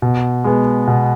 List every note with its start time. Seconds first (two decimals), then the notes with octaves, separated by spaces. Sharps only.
0.02 B2
0.44 G#3 B3
0.87 B2